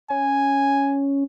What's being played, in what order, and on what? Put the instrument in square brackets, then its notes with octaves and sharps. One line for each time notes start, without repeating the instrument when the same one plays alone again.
[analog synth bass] C#4 [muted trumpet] G#5